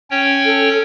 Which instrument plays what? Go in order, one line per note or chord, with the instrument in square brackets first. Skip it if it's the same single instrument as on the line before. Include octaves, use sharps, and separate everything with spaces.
[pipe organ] C#4 C#5 G5
[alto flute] A4